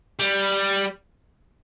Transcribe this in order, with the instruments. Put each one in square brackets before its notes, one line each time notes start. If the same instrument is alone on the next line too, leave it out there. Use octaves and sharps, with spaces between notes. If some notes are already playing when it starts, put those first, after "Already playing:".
[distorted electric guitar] G3